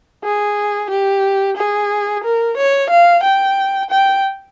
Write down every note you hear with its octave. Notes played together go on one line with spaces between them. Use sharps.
G#4
G4
G#4
A#4
C#5
F5
G5
G5